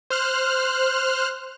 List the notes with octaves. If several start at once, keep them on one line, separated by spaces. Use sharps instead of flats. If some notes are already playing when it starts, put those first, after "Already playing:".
C5 F6 F#6